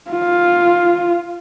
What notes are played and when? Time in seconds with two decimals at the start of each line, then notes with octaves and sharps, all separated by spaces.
0.11 F4